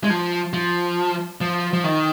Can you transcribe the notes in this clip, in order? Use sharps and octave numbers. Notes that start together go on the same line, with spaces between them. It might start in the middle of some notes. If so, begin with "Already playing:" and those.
G#3
F3
F3
F3
F3
D#3